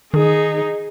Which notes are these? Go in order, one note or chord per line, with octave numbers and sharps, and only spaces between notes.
D#3 D#4 G#4